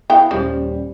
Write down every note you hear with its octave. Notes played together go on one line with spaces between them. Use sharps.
B3 E4 F5 G5
D#1 F3 G3 C#4